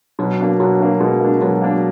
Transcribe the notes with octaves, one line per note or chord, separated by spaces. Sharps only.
B2 F#3
A#3 D4
B2 F#3
A#3 D4
B2 G#3
A#3 D4
B2 F#3
A#3 D4